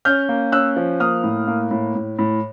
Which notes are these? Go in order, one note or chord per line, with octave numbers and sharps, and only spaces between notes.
C#4 F6 G6
A#3
C#4 E6 F#6
F3
A#3 D#6 F6
A2
A#3
A2
A2
A2